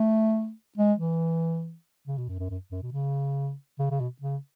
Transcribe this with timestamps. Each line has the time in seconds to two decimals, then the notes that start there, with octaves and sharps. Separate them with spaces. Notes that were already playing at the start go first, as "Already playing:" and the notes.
Already playing: A3
0.78 G#3
0.99 E3
2.07 C#3
2.18 B2
2.29 F#2
2.39 F#2
2.50 F#2
2.72 F#2
2.83 B2
2.93 C#3
3.79 C#3
3.91 C#3
4.00 B2
4.22 C#3